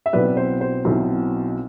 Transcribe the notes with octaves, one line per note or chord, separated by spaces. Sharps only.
E5
B1 B2 F#3 C4 E4 B4 D5
C5
C5
B1 B2 F#3 C4 E4